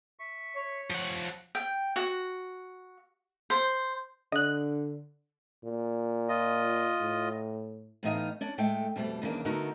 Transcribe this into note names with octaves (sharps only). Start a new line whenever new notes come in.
E5 C#6
C#5
F3 F#5
A5
G5
F#4
C5
D3 D#5 F#6
A#2
F4 D#5
A2
A2 E3 B3 D#4 D#5 F5
C#4 D4
A2 G#3 A3 G5
F2 B2 G3 A3
D#2 C#3 E3 A#3 D4
D3 A3 B3 D#4 F#4 A#4